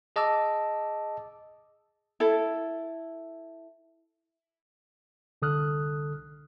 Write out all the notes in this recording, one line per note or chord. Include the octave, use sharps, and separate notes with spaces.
G#4 D#5 A5 D6 E6
E4 A4
C2 D3 A4 D#6 F6 F#6